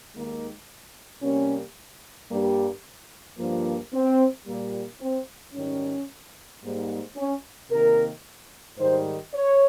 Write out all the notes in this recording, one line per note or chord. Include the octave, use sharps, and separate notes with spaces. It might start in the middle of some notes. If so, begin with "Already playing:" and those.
D#2 D#3 G#3 A#3
C3 G3 A#3 C#4
G2 G3 A#3
G2 F3 A#3
C4
A#2 G3 A#3
C4
G#2 D#3 G3 C#4
G#2 G3 A#3
C#4
C3 D#3 A#3 A#4
G#2 D#3 G3 C5
C#5